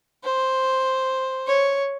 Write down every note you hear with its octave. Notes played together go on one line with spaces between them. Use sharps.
C5
C#5